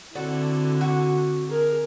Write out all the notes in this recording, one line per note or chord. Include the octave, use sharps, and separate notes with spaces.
D3 C4 E4 F#4 A4 D5
F#4
G#4 A#4